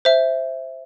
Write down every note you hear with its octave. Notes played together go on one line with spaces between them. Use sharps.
C5 E5